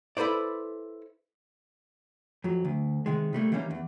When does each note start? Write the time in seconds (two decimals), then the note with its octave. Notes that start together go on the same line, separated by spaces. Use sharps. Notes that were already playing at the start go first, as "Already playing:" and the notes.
0.17 E4 A4 B4 C5 D5
2.44 F2 F#3
2.65 D2
3.06 C3 D#3 G#3
3.33 C3 G3 A3 A#3
3.52 E3 G3 A#3 C#4 D#4
3.71 E2